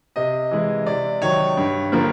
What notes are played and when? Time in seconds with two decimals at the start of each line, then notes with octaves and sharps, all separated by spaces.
0.16 C3 D#5
0.51 E3 G#3
0.86 C3 D5
1.22 D#3 F#3 C#5
1.57 G2
1.92 D3 F3 A#3